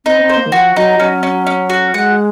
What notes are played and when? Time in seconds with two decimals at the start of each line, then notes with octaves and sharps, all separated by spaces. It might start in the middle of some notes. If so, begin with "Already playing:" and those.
0.05 C4 D#4
0.21 C4
0.29 C5
0.37 A#3
0.46 D#3
0.52 F3 F#4
0.76 F#3 D#4
1.00 F#3 C#4
1.23 C#4
1.47 C#4
1.70 F#4
1.94 G#3 F#5